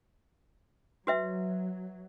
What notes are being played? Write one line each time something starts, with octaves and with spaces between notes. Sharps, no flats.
F#3 F#4 B4 E5